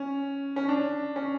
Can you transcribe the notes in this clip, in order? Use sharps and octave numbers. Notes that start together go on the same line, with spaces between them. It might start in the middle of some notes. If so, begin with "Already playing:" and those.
Already playing: C#4
C#4
D4
C#4